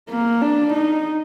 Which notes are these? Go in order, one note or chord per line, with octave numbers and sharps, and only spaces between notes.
A#3
D4
D#4